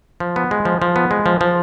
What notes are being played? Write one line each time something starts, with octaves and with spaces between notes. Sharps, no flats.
F3
B3
G#3
F3
F3
B3
G#3
F3
F3